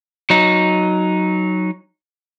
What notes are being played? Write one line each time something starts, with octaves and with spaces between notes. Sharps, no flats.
F#3 D#4